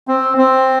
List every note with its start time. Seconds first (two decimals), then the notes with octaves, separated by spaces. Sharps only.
0.08 C4
0.38 C4